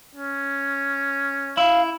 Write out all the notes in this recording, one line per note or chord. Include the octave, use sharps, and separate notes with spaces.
C#4
E4 F5